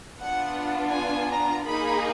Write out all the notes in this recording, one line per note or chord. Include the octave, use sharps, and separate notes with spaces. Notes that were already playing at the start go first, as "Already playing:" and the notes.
B3 D4 F4 F#5
G#5
A#5
A#3 D#4 G#4 B5